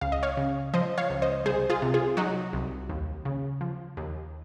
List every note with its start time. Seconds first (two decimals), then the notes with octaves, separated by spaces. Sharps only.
0.01 C#2 F5
0.12 D#5
0.23 C#5 F5
0.37 C#3
0.74 F3 C5 D#5
0.98 C#5 F5
1.10 C#2
1.22 C5 D#5
1.45 C2 G#4 C5
1.70 F4 G#4
1.82 C3
1.94 F4 G#4
2.17 F#3 D#4 F#4
2.53 C2
2.89 D#2
3.25 C#3
3.61 F3
3.97 D#2